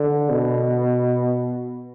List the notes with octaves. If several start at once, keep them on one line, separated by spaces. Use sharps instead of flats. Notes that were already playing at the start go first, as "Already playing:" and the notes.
Already playing: D3
B2